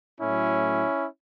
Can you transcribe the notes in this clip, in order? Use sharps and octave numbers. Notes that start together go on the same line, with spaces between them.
A2 F#3 A3 C#4 E4